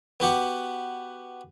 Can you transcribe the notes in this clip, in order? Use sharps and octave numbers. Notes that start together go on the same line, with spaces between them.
B3 F#4 G4 F#5